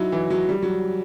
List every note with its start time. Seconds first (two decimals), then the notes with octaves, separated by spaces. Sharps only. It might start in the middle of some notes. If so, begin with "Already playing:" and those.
Already playing: F#3 D#4 E4
0.12 E3
0.30 F#3
0.49 G3
0.62 F#3